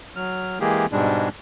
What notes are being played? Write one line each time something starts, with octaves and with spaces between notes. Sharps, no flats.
F#3 F6
E3 G#3 A#3 G4 G#4
G#2 B2 G3 G#3 D4